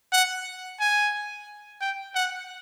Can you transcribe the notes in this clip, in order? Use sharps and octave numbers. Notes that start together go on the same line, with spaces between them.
F#5
G#5
G5
F#5